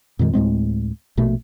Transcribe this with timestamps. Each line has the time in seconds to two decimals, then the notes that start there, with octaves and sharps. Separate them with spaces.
0.19 F2 A#2 D#3 G#3
0.34 D2 A2 G#3 C4
1.17 A#1 B2 A3